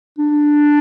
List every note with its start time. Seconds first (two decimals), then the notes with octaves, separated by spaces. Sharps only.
0.18 D4